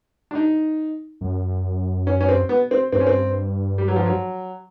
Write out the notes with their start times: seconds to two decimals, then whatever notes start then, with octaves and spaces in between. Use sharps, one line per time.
0.31 D4
0.35 D#4
1.21 F#2
2.07 C#4
2.21 C#4
2.29 C4
2.49 B3
2.71 C4
2.92 G2 C4
3.00 C#4
3.07 C4
3.78 G3
3.88 F#3
3.96 F3
4.06 F#3